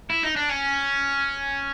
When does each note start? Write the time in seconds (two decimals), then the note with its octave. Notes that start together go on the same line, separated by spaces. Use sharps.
0.10 E4
0.23 D#4
0.36 D4
0.49 C#4